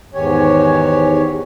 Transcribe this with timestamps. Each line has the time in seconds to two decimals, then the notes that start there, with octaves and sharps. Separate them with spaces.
0.14 E2 G#2 D#3 G4 C#5 G#5